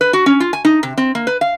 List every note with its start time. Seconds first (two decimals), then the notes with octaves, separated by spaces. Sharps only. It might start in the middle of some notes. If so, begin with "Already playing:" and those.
0.01 B4
0.13 F#4
0.26 C#4
0.40 F4
0.53 G#5
0.65 D#4
0.83 C3
0.98 C4
1.15 A#3
1.27 B4
1.41 F5